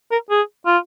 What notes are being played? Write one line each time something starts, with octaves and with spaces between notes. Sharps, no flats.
A#4
G#4
F4